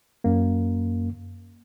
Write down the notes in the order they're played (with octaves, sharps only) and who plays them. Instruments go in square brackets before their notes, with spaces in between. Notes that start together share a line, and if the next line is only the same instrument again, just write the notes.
[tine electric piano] F#2 A#3